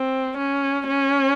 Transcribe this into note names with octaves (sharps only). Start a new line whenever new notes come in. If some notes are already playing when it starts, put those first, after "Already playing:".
Already playing: C4
C#4
C#4